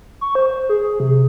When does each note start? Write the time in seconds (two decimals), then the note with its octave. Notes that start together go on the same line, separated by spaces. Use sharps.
0.21 C#6
0.35 C5
0.69 G#4
1.00 C3